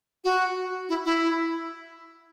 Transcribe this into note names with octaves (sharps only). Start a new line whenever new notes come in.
F#4
E4
E4